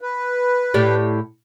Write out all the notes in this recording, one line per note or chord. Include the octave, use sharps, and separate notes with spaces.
B4
A2 G4 D5